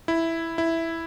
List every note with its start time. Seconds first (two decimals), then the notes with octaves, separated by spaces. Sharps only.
0.08 E4
0.58 E4